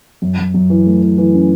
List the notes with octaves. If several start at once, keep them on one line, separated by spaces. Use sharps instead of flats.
F#2
F#2
F#2
E3
A3
E3
E3
C#4